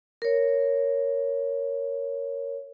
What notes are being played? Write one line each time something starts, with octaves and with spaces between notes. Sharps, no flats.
A#4 C#5